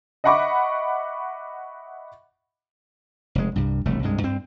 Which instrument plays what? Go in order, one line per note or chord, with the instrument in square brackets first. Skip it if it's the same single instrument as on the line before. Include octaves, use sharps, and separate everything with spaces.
[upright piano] D#5 E5 F#5 B5 C#6 D6
[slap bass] F1 G#3
C2 G2
E1 C2 A3
C2 G2 G#3
G2 C4